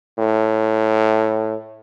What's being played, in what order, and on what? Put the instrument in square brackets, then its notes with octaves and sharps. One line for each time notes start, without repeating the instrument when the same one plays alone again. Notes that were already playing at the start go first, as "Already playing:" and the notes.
[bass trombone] A2